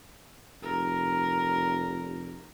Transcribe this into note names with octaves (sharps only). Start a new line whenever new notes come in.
F1 A#4